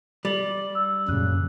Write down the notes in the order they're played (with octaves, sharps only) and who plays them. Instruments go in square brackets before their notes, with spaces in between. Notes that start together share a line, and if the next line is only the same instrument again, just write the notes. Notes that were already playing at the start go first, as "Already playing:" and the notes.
[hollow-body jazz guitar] G3 [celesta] A6 F#7
[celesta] E6
[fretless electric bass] F#2 A#2 [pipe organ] C#3 [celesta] F#6